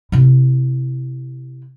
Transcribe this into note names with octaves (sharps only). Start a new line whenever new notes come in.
C3 E4